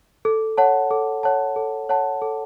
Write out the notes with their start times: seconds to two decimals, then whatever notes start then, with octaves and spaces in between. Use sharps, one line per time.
0.25 A4
0.57 C#5 F#5 A5
0.91 A4
1.23 C#5 F#5 A5
1.56 A4
1.89 C#5 F#5 A5
2.22 A4